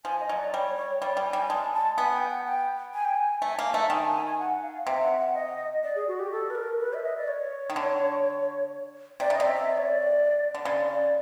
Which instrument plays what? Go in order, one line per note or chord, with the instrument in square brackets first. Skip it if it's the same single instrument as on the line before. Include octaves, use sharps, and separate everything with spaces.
[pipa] F3 [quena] G#5
[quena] D#5
[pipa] F#3
[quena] D5
[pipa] G3 [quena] C#5
[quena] C#5
[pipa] G3 [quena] D5
[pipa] G3
[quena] G#5
[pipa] G3
[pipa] G#3 [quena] A5
[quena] A5
[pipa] B3 [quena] G#5
[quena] G5
F#5
G5
G#5
G5
G#5
[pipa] A3 [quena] G#5
[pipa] A#3
[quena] A5
[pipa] A3
[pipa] D#3 [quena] G#5
[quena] G#5
G#5
G#5
F#5
F5
[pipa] C3 [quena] E5
[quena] F#5
F#5
D#5
D5
G#4
F#4
G4
A4
B4
A#4
B4
E5
D#5
D5
C#5
[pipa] D#3
D3
[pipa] C3 [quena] D5
[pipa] C#3 [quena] D#5
[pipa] C3 [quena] E5
[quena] E5
D5
C#5
D5
[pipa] D3
[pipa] C#3 [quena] D5
[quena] D5